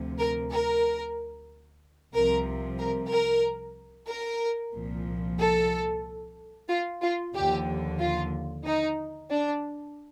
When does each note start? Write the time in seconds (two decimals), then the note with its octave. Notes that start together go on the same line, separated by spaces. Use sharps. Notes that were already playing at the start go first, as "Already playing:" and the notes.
Already playing: D2 C3 F3
0.18 A#4
0.51 A#4
2.13 C2 C3 F3 A#4
2.79 A#4
3.10 A#4
4.08 A#4
4.73 C2 A#2 F3
5.39 A4
6.68 F4
7.01 F4
7.34 D#2 D3 F3 G4
7.99 F4
8.64 D#4
9.30 D4